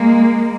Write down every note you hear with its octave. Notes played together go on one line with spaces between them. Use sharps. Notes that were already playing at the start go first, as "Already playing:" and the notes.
Already playing: G#3 A#3